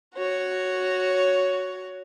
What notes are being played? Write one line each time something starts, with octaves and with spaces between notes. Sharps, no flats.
F#4 C#5